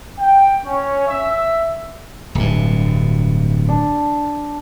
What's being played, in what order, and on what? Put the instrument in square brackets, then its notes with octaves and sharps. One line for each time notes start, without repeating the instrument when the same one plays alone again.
[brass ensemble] G5
C#4
E5
[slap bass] D1 G2
[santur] D4